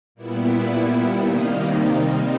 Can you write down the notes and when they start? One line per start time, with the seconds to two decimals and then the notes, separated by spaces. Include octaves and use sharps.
0.15 A#2 G3 B3 E4
1.06 C3 D#3 G3 A#3 D#4
1.97 G3 C4 D#4